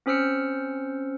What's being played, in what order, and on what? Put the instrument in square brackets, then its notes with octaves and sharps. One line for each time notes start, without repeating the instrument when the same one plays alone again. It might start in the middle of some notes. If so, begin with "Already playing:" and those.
[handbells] C4 C#4 C5 E6 F6 C#7